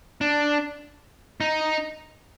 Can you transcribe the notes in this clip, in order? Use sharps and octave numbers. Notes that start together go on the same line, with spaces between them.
D4
D#4